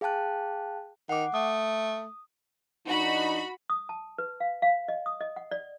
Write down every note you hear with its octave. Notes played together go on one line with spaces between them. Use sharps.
G#4 F5 G5 A5 F#6
D#3 F#5 D6
A3 D#6
E3 D4 D#4 F#4 B5
D#6
A5
B4
F5
F5
D#5
D#6
D#5
F#5
D5